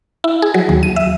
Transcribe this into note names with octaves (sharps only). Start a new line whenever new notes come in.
E4
G#4
F#3
D#2
D#7
E5